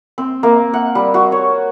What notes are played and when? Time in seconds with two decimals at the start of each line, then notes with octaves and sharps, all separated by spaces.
0.18 C4
0.43 A#3
0.74 F#5
0.95 G3
1.14 F#4
1.32 C#5